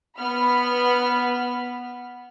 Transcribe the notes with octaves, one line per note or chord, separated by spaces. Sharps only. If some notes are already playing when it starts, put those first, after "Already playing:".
B3 B5 F6